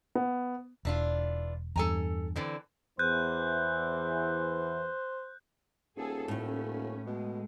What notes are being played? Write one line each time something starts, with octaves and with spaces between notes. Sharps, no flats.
B3
E1 E3 D4 F4
E2 G2 A4 G#5 A#5
D3 E3 C4
E2 E3 C5 F#6 G6
D#1 G#4 A4
A2 A3 C#4
B2 G#3